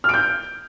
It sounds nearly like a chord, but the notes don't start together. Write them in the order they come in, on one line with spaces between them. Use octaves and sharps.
F6 D7 G6